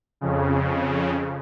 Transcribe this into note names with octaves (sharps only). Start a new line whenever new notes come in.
F2 C#3